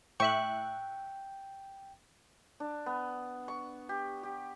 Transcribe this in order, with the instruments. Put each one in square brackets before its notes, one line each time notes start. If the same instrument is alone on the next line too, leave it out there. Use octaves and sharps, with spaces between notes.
[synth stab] A2 E5 F#6 [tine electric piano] G5 [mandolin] C#6
[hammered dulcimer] D4
B3
C#6
G4
G4